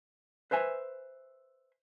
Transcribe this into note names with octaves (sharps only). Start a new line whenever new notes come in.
B4 C5 E5 G#5